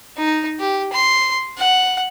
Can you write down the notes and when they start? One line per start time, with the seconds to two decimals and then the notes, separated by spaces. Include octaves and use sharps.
0.17 D#4
0.60 G4
0.92 C6
1.58 F#5